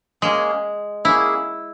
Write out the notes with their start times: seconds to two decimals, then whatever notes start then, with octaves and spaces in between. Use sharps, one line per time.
0.22 G#3 A#3 C#4 G#4
1.05 A#3 C#4 E4 G#4